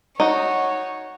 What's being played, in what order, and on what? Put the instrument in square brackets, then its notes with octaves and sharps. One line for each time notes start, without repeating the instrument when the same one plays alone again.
[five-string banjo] D#4 F#4 [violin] C#5